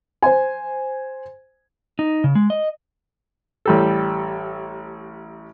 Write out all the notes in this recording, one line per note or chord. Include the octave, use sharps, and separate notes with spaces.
C5 G#5
D#4
C#3
G#3
D#5
A1 G3 A4